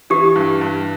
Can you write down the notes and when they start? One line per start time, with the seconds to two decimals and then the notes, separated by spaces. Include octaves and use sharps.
0.10 E3 G4
0.36 G2
0.61 G2